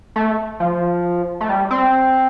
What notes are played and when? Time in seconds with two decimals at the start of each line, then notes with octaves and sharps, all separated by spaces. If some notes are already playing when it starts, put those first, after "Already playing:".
0.16 A3
0.60 F3
1.41 A3
1.49 G3
1.71 C4